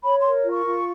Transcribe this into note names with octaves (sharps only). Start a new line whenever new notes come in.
C#5 B5
C6
A#4
F4
C#6
F4